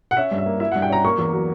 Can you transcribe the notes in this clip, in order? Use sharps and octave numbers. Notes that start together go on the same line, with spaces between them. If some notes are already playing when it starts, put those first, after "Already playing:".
F#5
C#4 E5
G2
E5
A#3
E4 E5
F#5
G2
G5
C#4 A#5
A#3 C#6
E2
F#3